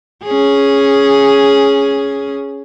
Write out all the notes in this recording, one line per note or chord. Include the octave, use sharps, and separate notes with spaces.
C#4 G#4